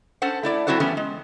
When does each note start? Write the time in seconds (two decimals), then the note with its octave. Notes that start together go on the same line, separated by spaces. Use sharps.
0.22 C#4 A4 C5 F#5
0.43 A3 E4 D5
0.67 F#3 C4 E4 F#4 A4 C5
0.80 E3 G3 A3 B3 C#4
0.97 G#3